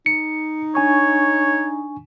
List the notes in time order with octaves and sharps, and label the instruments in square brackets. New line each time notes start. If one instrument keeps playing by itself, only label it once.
[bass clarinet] D#4 [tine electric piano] C#7
[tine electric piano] D4 G#5 C#6 [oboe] C#5